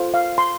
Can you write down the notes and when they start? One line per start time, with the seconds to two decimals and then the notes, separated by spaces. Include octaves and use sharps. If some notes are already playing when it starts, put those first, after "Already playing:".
Already playing: F4 A4 C5
0.14 F5
0.38 C6